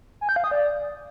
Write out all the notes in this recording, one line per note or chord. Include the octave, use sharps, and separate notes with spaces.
G#5
G6
F5
D#6
D5